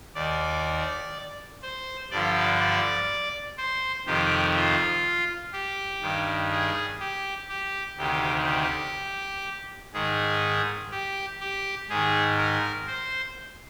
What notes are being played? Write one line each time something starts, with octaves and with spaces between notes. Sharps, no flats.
D#2 D#3 D5
C5
G2 D3 F3 D5
D5
C5
F2 C3 D#3 G4
F4
G4
G2 D#3
G#4
G4
G4
D2 C3 D#3 G4
G4
G#2 D#3 G#4
G4
G4
G#2 D#3 G#4
A#4
C5